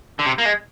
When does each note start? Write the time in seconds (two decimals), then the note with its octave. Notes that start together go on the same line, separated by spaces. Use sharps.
0.19 D3
0.26 C3
0.38 A#3
0.45 G#3